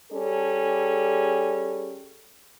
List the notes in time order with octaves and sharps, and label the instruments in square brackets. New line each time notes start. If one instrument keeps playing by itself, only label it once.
[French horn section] G3 C#4 G#4 A4